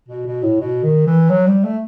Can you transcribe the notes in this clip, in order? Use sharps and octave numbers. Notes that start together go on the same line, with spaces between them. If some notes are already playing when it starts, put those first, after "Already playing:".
B2
B2
A2
B2
D#3
E3
F#3
G3
A3